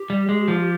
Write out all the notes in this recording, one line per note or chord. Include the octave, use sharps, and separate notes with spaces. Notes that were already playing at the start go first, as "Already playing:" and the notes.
Already playing: G4
G3
G#3
F3